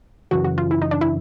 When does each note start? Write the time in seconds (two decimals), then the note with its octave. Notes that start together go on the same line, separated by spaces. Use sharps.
0.31 F#2 C#3 E3 F#4
0.44 F#4
0.58 F4
0.71 E4
0.82 D#4
0.91 D4
1.01 E4